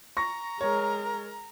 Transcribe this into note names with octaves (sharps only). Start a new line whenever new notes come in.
A#5 C#6 A#6
G#3 A#4 C#5